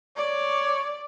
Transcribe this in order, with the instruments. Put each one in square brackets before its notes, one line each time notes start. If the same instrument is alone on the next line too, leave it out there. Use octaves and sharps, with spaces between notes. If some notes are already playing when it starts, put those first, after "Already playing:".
[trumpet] C#5 [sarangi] D5